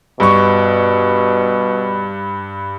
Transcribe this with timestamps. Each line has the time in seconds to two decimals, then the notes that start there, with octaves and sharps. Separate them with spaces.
0.20 G2 B2 C#6